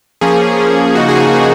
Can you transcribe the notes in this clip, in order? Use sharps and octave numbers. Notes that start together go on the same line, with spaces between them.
F3 A#3 C#4 G#4
F3 A#3 C#4
C#3 F3 A#3 D#4 F#4
G#4
G#4
C#3 F3 A#3 D#4 G#4